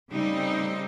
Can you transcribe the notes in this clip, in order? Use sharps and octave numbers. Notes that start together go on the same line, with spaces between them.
C#3 G3 A3 C4 D#4